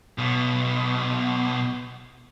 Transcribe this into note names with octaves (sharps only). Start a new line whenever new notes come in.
B1 B2